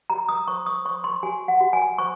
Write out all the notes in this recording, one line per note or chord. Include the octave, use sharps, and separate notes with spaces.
F#4 A#5
D#6
C5 C#6
D#6
C5 C#6
C6
F#4 G#5
F#5
F#4
G#5
C5 C#6